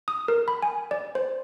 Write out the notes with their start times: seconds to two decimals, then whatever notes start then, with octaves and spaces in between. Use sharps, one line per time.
0.08 D#6
0.28 A#4
0.48 B5
0.62 G#5
0.91 D5
1.15 C5